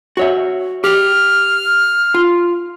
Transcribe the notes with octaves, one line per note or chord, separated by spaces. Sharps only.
F#4 C#5 E5
G4 F6
F4